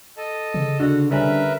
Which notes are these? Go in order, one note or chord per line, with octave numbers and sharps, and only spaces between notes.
A4 D#5 A5
C#3
D3 F#4
D3 G3 C#4 A#4 B4 E5